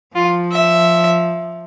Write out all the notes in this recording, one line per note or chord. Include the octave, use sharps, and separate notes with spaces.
F3 F4
E5